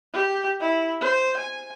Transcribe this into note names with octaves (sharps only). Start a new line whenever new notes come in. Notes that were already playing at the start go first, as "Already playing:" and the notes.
G4
E4
C5
G#5